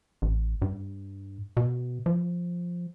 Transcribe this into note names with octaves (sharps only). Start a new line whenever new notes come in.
A1
G2
B2
F3